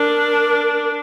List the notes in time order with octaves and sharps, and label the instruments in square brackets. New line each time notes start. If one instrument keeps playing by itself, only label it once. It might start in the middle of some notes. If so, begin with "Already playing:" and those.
Already playing: [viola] D4 [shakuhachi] A#4